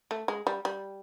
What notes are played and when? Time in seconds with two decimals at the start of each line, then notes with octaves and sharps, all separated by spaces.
0.11 A3
0.28 G#3
0.47 G3
0.65 G3